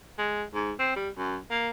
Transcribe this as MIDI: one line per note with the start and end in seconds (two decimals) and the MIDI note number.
0.18 0.43 56
0.54 0.72 44
0.79 0.94 60
0.96 1.09 55
1.17 1.37 42
1.50 1.71 58